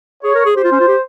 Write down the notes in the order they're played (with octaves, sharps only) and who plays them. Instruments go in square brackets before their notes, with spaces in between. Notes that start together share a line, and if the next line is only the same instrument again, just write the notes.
[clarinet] G#4 [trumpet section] C#5
[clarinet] A#4
G#4
[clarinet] G4 [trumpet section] C5
[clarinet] F4
C#4
F4
G4